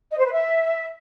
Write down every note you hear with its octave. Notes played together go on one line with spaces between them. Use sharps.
D#5
C5
B4
E5